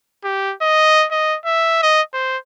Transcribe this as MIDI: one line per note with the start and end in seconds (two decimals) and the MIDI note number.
0.24 0.54 67
0.62 1.06 75
1.11 1.38 75
1.45 1.82 76
1.82 2.01 75
2.13 2.37 72